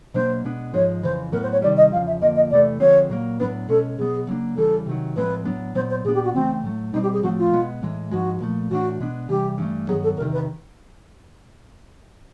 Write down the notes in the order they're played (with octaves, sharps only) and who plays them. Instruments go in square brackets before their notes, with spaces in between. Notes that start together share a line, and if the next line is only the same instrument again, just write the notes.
[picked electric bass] B2 F#3 A#3 D4 [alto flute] C5
[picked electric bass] B2 G#3 B3 D4
[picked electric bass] G#2 F3 G#3 [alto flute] C#5
[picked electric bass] F2 C#3 E3 [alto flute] C5
[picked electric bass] A2 F#3 B3 [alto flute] A#4
[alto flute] C5
C#5
[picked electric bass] C3 D#3 G3 [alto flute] D5
[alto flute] D#5
[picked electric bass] E2 C#3 F3 [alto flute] F5
[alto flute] E5
[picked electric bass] F2 D3 F3 A#3 [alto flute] D#5
[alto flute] D#5
[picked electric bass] E2 C3 E3 A3 [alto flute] D5
[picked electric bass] D3 F3 G#3 C4 [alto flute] C#5
[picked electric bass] A#2 F#3 A#3
[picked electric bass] A2 F#3 B3 D4 [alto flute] B4
[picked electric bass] B2 G#3 C#4 [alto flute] A4
[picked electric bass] B2 F#3 B3 [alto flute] G#4
[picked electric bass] C#3 F#3 A#3 D4
[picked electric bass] E2 C#3 E3 G3 [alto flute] A4
[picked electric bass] C3 D#3 F#3
[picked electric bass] A2 F3 G#3 C4 [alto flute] B4
[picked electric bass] A2 F#3 B3 D4
[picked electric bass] A#2 F#3 B3 [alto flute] C5
[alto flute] C5
[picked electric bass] A#2 G3 [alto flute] G#4
[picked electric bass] B3 D4
[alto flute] G4
F#4
[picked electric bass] C#3 E3 A3 [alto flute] C4
[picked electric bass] A2 F#3 A3
[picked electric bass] B2 G3 C4 [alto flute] D#4
[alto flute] G4
G#4
[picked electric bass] A2 F3 A3 C4 [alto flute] F#4
[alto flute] F4
[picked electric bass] B2 G#3 B3
A2 E3 G#3
[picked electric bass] G#2 F3 G#3 [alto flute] F#4
[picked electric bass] A#2 F3 A3
[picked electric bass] A2 E3 A3 D4 [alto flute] F#4
[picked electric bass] B2 G#3 B3 D4
[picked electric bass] C3 E3 G3 [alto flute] G4
[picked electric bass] G2 E3 A3
[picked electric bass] G2 D#3 F#3 B3 [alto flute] G#4
[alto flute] A4
[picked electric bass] E2 [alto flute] A#4
[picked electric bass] C3 D#3
[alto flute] B4